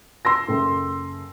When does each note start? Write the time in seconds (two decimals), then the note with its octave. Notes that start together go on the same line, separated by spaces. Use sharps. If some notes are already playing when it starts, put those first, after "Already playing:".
0.25 C6 E6 A#6
0.48 F#1 A4 G5